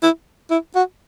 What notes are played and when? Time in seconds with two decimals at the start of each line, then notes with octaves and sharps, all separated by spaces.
0.03 E4
0.51 E4
0.75 F#4